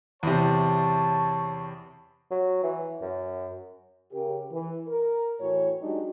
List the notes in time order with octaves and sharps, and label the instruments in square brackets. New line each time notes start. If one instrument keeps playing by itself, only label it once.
[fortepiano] E2 C3 [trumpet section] C#5 A5
[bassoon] F#3
E3
F#2
[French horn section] C#3 G4 A#4
E3
A#4
A2 E3 F#4 C#5
F#3 G#3 D4 D#4 F#4 G4